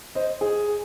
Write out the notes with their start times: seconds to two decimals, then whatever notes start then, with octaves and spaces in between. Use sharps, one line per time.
0.15 C5 D#5
0.41 G#4